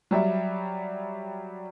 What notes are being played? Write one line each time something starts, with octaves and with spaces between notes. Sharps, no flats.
F#3 G3 E5